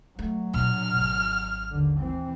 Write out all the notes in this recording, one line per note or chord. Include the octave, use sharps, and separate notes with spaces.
F#3 A3
A#2 D4 F6
G#1
D#2 D3
E3 C4